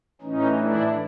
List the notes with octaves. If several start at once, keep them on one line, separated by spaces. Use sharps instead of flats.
A2 E3 C#4 D#4
D4 E4